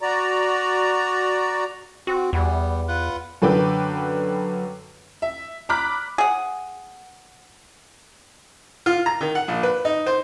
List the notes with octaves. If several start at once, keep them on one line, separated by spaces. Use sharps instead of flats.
F#4 D5 A#5
C4 F#4
E2 G3 B3
F4 B4 F#5
F#2 D3 B4 G5 D6
E5
A#5 B5 D6 F6 F#6 B6
G#4 F#5
F4
A#5
D#3
F#5
A#1
B4
D#4
C5